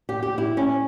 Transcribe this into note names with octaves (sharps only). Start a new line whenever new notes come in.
G4
G4
E4
C#4